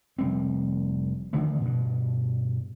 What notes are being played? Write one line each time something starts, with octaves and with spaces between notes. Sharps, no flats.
F1 G3 C4
D3 D#3 F3 A3
G2 B2